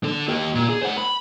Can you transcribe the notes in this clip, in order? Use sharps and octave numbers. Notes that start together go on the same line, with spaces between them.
D3 A4
A#3 G4
A#2
G#4
C5 F#5
B5